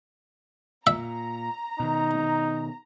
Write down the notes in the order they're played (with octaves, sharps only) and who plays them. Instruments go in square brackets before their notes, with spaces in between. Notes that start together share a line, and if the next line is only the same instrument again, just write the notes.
[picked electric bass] A#2 [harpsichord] E5 [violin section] A#5
[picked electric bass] B2 D#3 [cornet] D#4